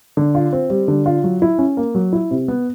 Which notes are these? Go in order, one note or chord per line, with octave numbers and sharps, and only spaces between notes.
D3
F4
C4
G3
D3
F4
F#3
E4
C#4
A#3
F#3
E4
C3
B3